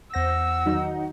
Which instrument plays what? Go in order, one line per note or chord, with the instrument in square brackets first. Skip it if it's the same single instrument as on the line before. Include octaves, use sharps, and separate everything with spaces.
[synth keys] E2 C5 A#6 [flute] F#5 [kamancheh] E6
[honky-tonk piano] D#3 F#3 D#4